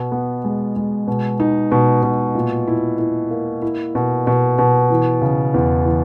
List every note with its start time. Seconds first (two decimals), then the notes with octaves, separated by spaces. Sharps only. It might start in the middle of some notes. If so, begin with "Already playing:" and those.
Already playing: B2
0.12 B3
0.44 G#3
0.76 G#3
1.07 B2
1.40 D#4
1.72 B2
2.03 B2
2.35 A#2
2.68 E4
2.99 E4
3.31 A#3
3.62 E4
3.95 B2
4.27 B2
4.59 B2
4.90 E3
5.22 C#3
5.54 E2
5.85 E3